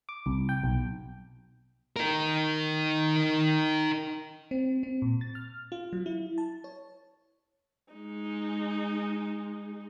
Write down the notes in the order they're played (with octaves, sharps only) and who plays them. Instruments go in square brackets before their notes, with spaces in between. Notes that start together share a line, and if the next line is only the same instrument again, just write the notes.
[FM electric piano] D6
C2
G5
B1
[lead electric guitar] D#4 A#4
[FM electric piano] C4
C4
A#2
A6
F6
F4
F#3
E4
A5
C#5
[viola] G#3 D#4